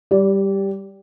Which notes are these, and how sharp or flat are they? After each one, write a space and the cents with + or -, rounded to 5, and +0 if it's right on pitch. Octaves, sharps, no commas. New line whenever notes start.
G3 +0 D5 -25